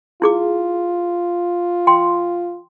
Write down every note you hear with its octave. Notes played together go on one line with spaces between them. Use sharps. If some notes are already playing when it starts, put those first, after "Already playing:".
E4 F4 G#4 D6
G5 C6